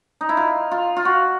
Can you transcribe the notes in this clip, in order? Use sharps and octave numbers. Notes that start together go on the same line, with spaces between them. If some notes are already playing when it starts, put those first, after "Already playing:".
D#4
E4
F4
F4
F4
F#4